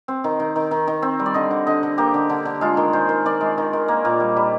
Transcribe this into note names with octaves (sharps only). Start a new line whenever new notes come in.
C4
D#3
D#3
D#3
D#3
D#3
C4
G3
D5
D3 D#5
D3
D3 D#5
D3
A#3 G4
D3
D3
D3
G#3 F4
D#3
D#3 C5
D#3
D#3 D5
G#3
D#3
D#3
A#3
A#2
G3
G3